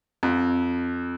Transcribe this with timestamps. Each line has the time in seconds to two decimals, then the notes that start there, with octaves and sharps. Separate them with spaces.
0.23 F2